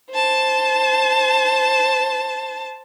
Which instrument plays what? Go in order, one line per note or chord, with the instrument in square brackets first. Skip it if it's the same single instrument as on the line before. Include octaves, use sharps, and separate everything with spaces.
[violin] C5 A5